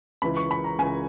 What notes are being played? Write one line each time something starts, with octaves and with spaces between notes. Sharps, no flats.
C#2 C#3 E3 B5
C#6
B5
A#5
C#2 C#3 E3 G#5